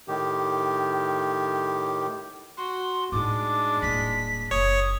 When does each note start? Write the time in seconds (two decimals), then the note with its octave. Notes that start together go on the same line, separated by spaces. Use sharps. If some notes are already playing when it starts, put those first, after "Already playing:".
0.08 A2 D#3 G4
2.58 F#4 C6
3.12 A2 G#3 D4 D#4 D6
3.82 D#1 A2 B6
4.51 F#1 C#5 D#6